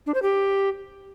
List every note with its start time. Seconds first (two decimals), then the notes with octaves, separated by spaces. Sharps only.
0.06 D4
0.14 C5
0.22 G4